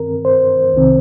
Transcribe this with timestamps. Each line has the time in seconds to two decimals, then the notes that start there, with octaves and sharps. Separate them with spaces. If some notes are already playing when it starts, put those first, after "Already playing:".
Already playing: G2 D#3 C4 A#4
0.25 C5
0.74 C2 C3 D#3 C4